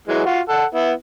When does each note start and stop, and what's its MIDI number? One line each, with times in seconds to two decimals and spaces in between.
0.08 0.22 52
0.08 0.22 54
0.08 0.22 56
0.25 0.40 65
0.25 0.40 66
0.49 0.65 69
0.49 0.65 78
0.75 0.91 59
0.75 0.91 64